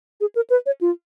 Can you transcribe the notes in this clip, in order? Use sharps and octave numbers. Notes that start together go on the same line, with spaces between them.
G#4
A#4
B4
C#5
F4